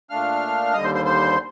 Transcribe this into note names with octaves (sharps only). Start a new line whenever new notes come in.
A#2 A3 D4 F5 F6
D#2 D3 G3 D#5 D#6
C5 C6
C5 C6
C5 C6